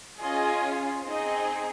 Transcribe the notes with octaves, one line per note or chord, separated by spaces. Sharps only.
C#4 F4 G#4 D#5
C4 D#4 G#4 D#5